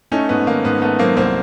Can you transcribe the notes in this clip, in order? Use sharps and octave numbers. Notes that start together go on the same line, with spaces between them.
A3 C#4 D#4
G#2 B3
D#3 A#3
G#2 B3
A3 B3
F#3 A#3 C4
C2 A#3 C4